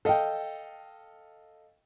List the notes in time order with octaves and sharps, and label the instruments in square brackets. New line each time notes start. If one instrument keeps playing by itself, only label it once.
[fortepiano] A4 D#5 F5 [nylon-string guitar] G5 A5